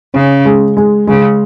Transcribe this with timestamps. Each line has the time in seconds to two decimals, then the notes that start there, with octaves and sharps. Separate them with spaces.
0.13 C#3 C#4
0.45 G#3
0.77 G#3
1.07 C#3 G#3